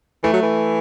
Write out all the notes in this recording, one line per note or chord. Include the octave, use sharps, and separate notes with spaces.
E3 A3
F#3
E3